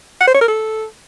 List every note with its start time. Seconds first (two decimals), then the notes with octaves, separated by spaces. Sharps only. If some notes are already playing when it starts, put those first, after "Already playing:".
0.21 F#5
0.27 C5
0.34 C#5
0.41 A#4
0.48 A4